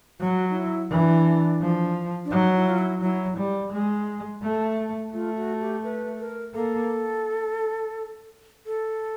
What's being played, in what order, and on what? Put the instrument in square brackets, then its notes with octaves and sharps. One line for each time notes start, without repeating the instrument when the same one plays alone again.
[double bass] F#3 [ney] F#4
[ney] D#4
E4
[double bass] E3 [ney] D4
[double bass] F3
[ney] D4
[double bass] F#3 [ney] D#4
[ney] E4
F4
E4
[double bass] F#3 [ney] E4
[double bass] G3
G#3
A3
[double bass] A3 [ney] F4
[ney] F#4
G4
B4
A#4
[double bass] A#3 [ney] A4
[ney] A4